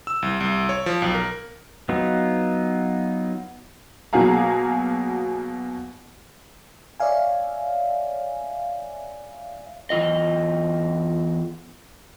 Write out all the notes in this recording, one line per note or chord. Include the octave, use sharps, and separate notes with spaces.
E6
C2
C2
C#5
F3
B1
A#4
F#3 B3 D#4 F4
B2 F#3 A#3 G#4 F5 A#5
C#5 D5 E5 F5 G#5
E2 C#3 F4 D#5